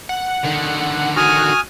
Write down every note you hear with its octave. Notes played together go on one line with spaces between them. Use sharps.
F#5
D3 D#3
F#4 G#5 D#6 F6